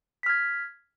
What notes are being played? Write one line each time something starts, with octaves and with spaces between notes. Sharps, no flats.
F6 G#6 B6